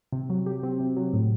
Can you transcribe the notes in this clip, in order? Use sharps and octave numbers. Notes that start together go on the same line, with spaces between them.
C3
F#3
G4
C4
C3
F#3
A2